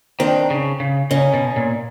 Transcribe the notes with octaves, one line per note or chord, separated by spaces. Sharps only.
D#3 C4 D4
C#3
C#3
C#3 C#4 D#4
B2
A#2